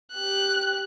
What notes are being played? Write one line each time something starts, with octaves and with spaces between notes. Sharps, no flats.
G4 F#6